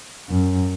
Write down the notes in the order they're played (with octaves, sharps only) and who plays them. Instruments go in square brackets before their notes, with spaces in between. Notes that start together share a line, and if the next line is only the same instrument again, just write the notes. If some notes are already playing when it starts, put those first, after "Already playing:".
[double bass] F#2